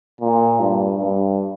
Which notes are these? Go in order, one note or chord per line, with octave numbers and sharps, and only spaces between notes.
A#2
G2
G2